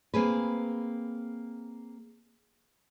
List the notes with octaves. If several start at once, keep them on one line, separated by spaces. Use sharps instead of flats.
A#3 C4 G#4 B4